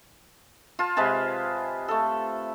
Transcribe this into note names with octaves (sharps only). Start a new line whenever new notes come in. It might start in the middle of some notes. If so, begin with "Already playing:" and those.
F4 A5
C3 G#3 B4 A5
A3 A4